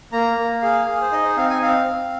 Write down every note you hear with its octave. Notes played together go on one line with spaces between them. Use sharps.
A#3 A#5
A#3
G#4 F5
G#4
C5
D#4 D#5
C5
C4 F5
G#5
C4 F5
C4